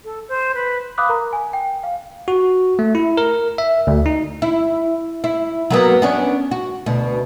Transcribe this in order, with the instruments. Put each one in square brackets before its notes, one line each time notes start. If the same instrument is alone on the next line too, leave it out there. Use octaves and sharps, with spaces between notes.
[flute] A4
C5
B4
[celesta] F5 B5 D6 D#6 F#6
A#4 A#5
G#5
G5
F5
[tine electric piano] F#4
A3
E4
A#4
E5
D2
D#4
[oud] E4
E4
F#3 A#3 B3
B3 C#4 D4
F#4
D2 B2